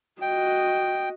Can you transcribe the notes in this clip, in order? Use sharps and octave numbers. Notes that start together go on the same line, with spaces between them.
F#4 D#5 G5